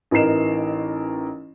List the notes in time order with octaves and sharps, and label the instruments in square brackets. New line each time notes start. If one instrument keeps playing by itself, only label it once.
[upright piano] A1 E3 D#4 A#4 C7 E7